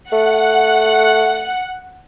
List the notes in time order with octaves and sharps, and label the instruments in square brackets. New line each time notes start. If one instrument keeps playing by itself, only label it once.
[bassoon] A3 [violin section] F#5